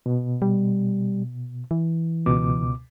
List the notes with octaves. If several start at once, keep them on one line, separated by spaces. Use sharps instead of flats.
B2
G3
E3
C#2 B2 D6